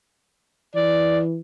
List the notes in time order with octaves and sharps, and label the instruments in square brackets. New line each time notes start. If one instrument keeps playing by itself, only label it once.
[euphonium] E3 [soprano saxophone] D5